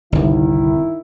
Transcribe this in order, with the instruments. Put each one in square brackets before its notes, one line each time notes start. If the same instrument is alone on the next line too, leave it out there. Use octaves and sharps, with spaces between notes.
[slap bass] G1 C2 [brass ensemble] D#3 E4